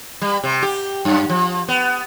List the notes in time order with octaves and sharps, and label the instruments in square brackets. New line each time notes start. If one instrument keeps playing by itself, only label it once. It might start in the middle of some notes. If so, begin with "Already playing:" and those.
[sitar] G3
C3
G4
F#2
F3
B3